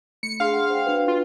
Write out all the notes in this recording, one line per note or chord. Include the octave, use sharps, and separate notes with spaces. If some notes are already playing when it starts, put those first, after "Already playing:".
A3 C#7
D4 G#4 F5 C6
F#5
C5 G5
D4 F#4 B4
F4